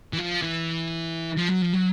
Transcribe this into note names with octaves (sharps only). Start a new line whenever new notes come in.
E3
F3
E3
F3
F#3
F3
F#3